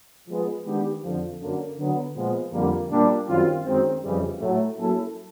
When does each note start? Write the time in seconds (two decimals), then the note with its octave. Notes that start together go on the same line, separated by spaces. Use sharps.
0.28 F3 G#3 B3
0.65 D#3 G#3 B3 D4 G4
1.03 F2 D3 F3
1.41 F#2 D3 F#3 A#3
1.78 D3 F#3 B3
2.15 A#2 F3 G#3 B3
2.53 F2 D3 G3 A#3
2.90 A#2 G3 A#3 D4
3.27 F#2 D#3 G3 C4 F4
3.65 F#2 D#3 G#3 C4
4.02 F2 C#3 E3 G3
4.40 A2 F#3 A3
4.77 F#3 A#3 C#4 E4 A4